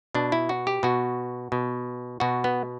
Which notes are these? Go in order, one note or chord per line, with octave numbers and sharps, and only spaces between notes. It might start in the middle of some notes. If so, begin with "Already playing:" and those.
B2 D4
E4
F#4
G4
B2 F#4
B2
B2 F#4
B3